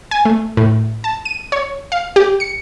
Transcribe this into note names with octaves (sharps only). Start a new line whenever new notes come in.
G#5
A3
A2
A5
D#7
C#5
F5
G4
C#7